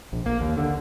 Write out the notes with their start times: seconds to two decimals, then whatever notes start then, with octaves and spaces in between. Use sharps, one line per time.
0.12 A#1
0.26 A#3
0.41 D#2
0.57 D3